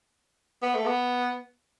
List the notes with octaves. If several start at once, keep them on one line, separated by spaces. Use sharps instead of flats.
B3
A3
B3